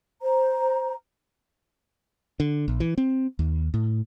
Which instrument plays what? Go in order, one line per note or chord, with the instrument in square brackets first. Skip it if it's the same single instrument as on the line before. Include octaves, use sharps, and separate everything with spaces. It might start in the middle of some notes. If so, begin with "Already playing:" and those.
[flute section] C5 A#5
[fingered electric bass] D3
A#1
E3
C4
D#2
A2